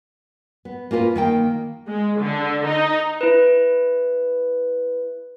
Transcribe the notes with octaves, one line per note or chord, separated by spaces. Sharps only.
B3
A#3 C#4 F4 A#4 B4
D#3 A#3 G5
G#3
D3
D#4
E4 B4